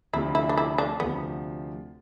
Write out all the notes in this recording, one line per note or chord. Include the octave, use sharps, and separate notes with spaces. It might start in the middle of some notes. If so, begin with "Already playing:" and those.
D2 C3 F3 E4
E4
D4
E4
D4
D2 C3 F3 B3